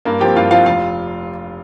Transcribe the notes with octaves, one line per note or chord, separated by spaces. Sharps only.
G2 A#3 A#4
F3 C4 G4 G5
G2 F4 F5
F3 C4 F4 F5
F1 F4 F5